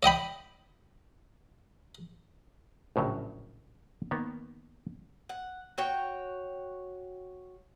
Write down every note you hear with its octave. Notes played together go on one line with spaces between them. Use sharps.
D5 D#5 G5 B5
A#1 A2 C#3 F#3
D#3 A#3 B3
F#5
F#4 C#5 G5